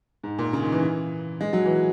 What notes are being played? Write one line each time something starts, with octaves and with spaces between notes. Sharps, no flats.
G#2
A#2
C#3
D#3
E3
G#3
F#3
E3